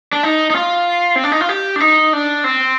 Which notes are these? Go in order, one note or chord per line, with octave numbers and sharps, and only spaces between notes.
D4
D#4
D#4
F4
C4
D4
D#4
F4
G4
D4
D#4
D4
C4